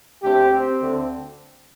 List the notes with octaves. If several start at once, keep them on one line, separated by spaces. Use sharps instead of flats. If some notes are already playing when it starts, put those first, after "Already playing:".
D2 D3 A3 C4 G4
C4
D2 D3 A3